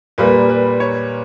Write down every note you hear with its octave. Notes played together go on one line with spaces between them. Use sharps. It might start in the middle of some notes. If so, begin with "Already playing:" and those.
A#2 G3 A#3 B4
B4
C#5